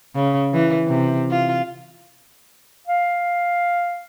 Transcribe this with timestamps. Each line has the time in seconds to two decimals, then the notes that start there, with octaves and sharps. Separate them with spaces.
0.15 C#3
0.53 E3
0.88 C3
1.31 F4
2.87 F5